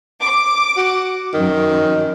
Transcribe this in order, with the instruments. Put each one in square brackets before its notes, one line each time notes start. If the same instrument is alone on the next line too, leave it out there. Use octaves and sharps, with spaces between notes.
[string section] D6
[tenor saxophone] F#4
[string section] F#2 [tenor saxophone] D#3